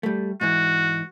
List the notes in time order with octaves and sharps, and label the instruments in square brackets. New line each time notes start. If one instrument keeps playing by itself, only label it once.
[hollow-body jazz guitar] G3 A3
[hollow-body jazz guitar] G#2 E3 [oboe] F#4